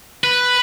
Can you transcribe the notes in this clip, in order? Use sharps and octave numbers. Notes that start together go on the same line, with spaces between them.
B4